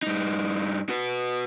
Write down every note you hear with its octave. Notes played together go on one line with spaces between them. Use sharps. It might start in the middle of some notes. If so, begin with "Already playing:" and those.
G2 D#4
F#4 B4